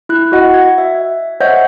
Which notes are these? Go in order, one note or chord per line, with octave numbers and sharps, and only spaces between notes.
E4 F#6
F#4 D#5 F#5
G#6
E5
C5 C#5 D#5 E5 F#5 G6